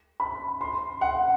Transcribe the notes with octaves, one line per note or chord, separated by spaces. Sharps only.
B5
C6
F#5